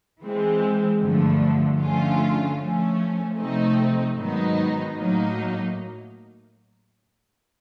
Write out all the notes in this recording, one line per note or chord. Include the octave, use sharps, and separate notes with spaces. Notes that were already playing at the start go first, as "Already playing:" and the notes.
E3 G#3 C4
G2 D3 F3 A3
D3 F3 A3 C#4 F4
F3 A3 C#4
C3 F3 A3 C4 D#4
G#2 D#3 F#3 B3 D#4
A2 F#3 A#3 D#4